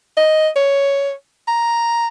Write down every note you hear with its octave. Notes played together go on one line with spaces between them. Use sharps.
D#5
C#5
A#5